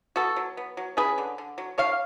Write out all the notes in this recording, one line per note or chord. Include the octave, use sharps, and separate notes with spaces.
B3 F#4 A4
F#3
B3
F#3
C#4 G#4 B4
D3
D3
F#3
D3 C#5 F5